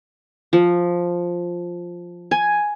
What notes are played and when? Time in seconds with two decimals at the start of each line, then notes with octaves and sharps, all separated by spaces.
0.53 F3
2.31 G#5